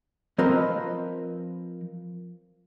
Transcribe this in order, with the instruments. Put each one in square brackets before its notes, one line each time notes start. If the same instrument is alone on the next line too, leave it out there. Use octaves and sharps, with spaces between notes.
[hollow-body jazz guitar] F3 C4 F4 A#4 B4 D#5